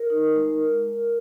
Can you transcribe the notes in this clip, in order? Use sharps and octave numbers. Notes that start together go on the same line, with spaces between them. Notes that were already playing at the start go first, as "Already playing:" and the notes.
Already playing: A#4
D#4
G#3